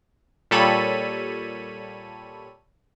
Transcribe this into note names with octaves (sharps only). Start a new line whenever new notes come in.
A#2 G3 A4 C#5 B5 D#7